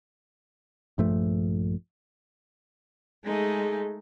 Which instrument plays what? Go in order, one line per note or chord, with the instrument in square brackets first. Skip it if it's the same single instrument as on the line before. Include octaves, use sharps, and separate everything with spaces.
[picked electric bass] A#1 G2 F3 A3
[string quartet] G#3 A3 D#4 [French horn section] G#4